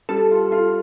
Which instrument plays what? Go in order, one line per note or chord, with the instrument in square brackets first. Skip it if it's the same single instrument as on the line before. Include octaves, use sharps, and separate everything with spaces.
[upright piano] G3 [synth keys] A4
[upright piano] F4
F4